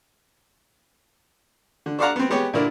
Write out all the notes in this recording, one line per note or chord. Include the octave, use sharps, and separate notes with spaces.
D3
D4 A4 D5 F5 F#5 A#5
B3 C4
G#3 B3 G4 C#5
A#2 D3 D4 E4 A#4